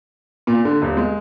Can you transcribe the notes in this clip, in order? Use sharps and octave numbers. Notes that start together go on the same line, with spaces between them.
A#2
D3
D#1
G#3